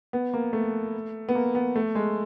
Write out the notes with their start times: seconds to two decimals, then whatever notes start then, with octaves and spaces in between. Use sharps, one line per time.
0.13 B3
0.34 A#3
0.53 A3
1.29 B3
1.35 A#3
1.55 B3
1.76 A3
1.95 G#3